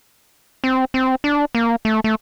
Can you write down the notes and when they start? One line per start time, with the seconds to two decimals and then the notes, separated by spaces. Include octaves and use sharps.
0.64 C4
0.94 C4
1.24 D4
1.55 A#3
1.85 A3
2.04 A3